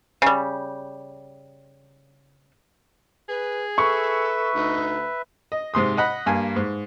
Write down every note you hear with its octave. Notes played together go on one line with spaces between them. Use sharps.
C#3 G3
G#4 B4
A4 B4 E5 C#6
D2 D#4
D#5
G#2 C3 C6 D#6
D#5 F#5 B5
G2 A#3 G#5
G#2